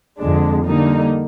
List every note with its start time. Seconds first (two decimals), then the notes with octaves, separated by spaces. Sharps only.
0.18 F2 D3 G#3 D4
0.65 D3 G3 A#3 D#4